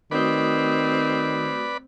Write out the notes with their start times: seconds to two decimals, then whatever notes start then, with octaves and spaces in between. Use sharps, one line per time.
0.11 D#3 A3 C4 F#4 B4 D5 B5 D#6